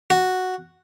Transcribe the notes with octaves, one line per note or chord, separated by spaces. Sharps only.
F#4